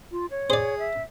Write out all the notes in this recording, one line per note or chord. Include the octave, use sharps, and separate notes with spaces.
F4
C#5
G#4 C5 D5
E5